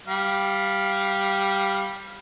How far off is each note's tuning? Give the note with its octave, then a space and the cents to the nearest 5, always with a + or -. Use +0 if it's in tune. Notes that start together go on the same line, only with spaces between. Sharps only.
G3 +0 F5 +0